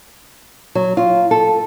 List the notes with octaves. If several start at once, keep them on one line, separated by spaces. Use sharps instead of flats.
F#3
F4
A4